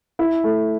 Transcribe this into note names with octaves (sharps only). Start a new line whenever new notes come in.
E4
A3